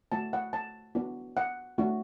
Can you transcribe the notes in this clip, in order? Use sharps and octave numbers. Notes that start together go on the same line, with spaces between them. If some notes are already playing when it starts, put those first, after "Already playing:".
A3 F#4 A5
F#5
A5
B3 D4 F#4
F#5
A3 D4 F#4